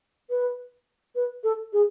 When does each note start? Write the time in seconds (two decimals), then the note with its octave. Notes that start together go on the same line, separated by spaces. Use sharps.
0.30 B4
1.16 B4
1.44 A4
1.73 G#4